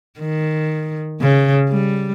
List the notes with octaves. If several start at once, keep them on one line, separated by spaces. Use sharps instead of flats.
D#3
C#3
G3